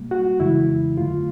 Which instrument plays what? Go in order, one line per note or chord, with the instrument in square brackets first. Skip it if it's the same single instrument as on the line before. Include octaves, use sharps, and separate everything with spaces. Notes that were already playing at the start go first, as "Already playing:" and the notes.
Already playing: [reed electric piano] B2 G3 A#3
F#4
F2 C#3 E3 G#3 E4
G2 D3 F#3 A3 F4